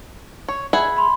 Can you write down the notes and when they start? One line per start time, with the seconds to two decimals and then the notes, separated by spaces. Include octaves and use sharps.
0.48 C#5
0.73 G#4 E5 F#5 B5 G#6
0.97 B5 C6